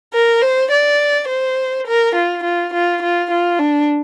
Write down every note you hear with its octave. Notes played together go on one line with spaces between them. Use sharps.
A#4
C5
D5
C5
A#4
F4
F4
F4
F4
F4
D4